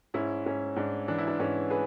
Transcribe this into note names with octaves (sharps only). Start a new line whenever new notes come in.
G#2 C#4 E4
G#2 C#4
G#2 D4
E3 D4
E4
D4
G#2 C#4
G#4 B4